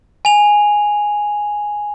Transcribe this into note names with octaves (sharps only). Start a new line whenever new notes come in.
G#5 F7